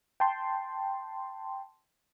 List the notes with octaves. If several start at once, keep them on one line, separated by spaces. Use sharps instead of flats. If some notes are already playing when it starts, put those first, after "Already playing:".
G5 A5 C6